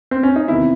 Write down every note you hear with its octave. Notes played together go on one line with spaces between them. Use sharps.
C4
C#4
D#4
E2 C3 D#3 E4